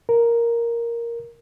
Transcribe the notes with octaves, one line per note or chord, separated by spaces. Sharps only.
A#4